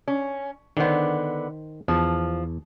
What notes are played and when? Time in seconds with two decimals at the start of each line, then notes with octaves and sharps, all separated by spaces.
0.08 C#4
0.77 D3 D#3 B3 C5
1.88 E2 F3